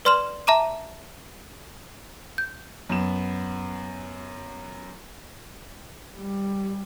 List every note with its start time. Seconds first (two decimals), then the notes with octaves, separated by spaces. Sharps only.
0.05 B4 D5 C6 F6 E7 F#7
0.47 E5 A5 A#5 D6 D#7
2.38 G6
2.90 F#2 B3 E7
6.17 G3